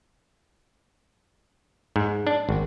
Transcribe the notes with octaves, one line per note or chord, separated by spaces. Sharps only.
G#2
D4
G#1